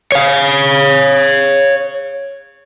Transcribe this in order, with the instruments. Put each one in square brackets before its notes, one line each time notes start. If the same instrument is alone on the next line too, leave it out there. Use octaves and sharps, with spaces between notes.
[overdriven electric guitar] C#5 F5